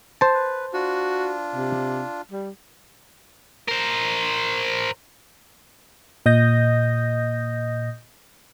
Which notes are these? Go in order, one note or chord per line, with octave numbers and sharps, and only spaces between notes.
C5 A5
B4
D4 F4 F#4
C3
G3
A#4 C5
A#2 D#5 D#6 G6 A#6